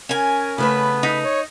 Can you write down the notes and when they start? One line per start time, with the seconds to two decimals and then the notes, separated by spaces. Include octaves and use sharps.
0.09 C#4 A#4 G#5
0.58 C#3 A3 B3 B4
1.03 D#4 B5
1.23 C#5